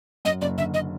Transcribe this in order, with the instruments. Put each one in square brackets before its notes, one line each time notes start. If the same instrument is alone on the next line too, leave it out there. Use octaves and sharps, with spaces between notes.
[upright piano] F#2 [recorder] D#5
[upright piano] F#1 [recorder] D5
[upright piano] D3 [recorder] E5
[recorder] D#5